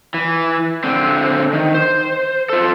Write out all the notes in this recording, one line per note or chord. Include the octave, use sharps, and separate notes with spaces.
E3
D3 C4
D#3
C5
F4 A4